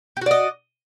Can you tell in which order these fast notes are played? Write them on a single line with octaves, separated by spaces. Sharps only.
G4 F#4 D5 D#5